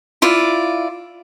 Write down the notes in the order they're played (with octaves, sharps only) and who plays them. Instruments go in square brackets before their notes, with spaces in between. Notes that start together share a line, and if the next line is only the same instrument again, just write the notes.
[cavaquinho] E4 F4 D5